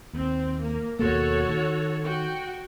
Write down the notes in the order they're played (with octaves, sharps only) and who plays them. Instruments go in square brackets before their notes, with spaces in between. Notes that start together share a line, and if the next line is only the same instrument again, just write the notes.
[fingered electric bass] D#2 [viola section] C4
[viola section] A#3
[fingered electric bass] D#2 B2 A#3 [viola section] F#4 A4 C#5
[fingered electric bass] D#3
[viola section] F#4 G5